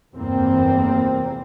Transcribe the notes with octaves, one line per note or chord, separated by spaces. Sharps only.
F1 E2 G2 E3 A#3 C4